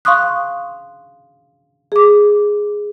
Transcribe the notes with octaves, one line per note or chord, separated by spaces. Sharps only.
F5 C6 C#6 D#6 F#6
G#4 D6